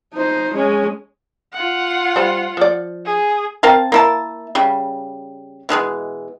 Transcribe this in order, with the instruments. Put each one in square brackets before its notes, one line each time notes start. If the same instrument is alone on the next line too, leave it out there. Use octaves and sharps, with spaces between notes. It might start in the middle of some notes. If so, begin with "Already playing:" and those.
[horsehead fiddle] D#4 C5
G#3 C#4
[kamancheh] F4 F#5
[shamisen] G3 C5
F3 D5
[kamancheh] G#4
[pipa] C4 A#4 F5 A5
A#3 E4 A5
C#3 G3
B2 E3 F3 G#3